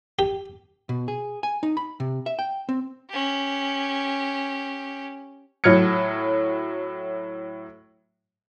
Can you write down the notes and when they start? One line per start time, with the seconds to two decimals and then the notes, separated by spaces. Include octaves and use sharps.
0.19 G4
0.89 B2
1.08 G#4
1.43 G#5
1.63 D#4
1.77 B5
2.00 C3
2.26 E5
2.39 G5
2.69 C4
3.10 C#4 G4
5.64 A2 F#3 F6 G#6 C#7